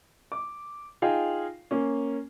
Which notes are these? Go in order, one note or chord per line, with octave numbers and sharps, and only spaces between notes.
D6
D#4 F4 G#4 F5 G5
A#3 C#4